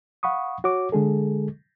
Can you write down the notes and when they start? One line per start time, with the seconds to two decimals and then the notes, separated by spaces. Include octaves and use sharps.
0.23 F5 F#5 B5 C#6 D#6
0.64 F#4 C#5 D6
0.92 D3 G#3 G#4 A4